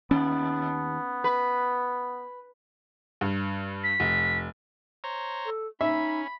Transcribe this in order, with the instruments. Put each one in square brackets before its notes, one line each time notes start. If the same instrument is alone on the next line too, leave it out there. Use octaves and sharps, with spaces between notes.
[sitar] D#2 [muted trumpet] B3 [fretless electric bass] C#4
[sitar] B4
[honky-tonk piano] G2
[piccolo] B6
[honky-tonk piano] F1
[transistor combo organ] C5 C#5 A#5
[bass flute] A4
[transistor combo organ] C#4 [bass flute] D#4 [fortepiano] E5 [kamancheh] B5